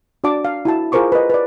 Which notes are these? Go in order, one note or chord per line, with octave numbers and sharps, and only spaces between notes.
D4 F#4 D5 A5 D6
F5
E4 F#4 A5
F4 G#4 A#4 C5 C#6 D6
B4 D#5
B4 D5